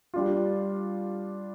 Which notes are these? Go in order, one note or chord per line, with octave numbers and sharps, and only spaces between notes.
G3 D4 F4